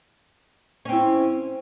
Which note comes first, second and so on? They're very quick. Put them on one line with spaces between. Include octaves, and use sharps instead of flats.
C#4 C4 E4